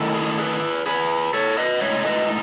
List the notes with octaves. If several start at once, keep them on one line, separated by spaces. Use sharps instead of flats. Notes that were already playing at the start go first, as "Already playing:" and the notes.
Already playing: D#3 A3 E4
G#4
G#4 B4
G#4 B4
A4 C#5
B4 D#5
A2 G#3 D#4 C#5 E5
B4 D#5